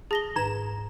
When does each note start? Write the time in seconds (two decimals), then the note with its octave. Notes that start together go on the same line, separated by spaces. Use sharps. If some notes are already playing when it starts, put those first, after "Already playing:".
0.11 G#4 A5 A#6 G7
0.36 G#2 D#3 B4 A#5 G#6 E7